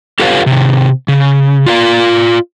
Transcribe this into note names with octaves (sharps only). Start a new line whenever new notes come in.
F4 G4 A4 B4 C#5 F5
C3 D#3
C#3
F4 D5 F5